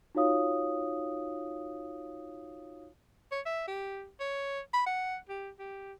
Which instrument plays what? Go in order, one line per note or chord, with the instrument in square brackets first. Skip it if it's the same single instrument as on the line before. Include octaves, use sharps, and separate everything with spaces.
[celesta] D#4 F4 F#4 C#5 F5 D#6
[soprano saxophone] C#5
E5
G4
C#5
B5
F#5
G4
G4